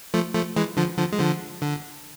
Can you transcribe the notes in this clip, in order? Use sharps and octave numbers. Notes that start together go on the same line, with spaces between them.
F3 A3
F3 A3
E3 G#3
D3 F3
D3 F3
G#3
D3 F3
D3